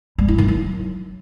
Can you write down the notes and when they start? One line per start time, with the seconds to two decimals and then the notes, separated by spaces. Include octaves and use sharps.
0.18 G3
0.28 E4
0.38 D#3
0.48 F#3